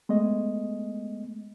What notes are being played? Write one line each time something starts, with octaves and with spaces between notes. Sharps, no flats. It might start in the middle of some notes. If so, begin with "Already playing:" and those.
G#3 A3 B3 D#5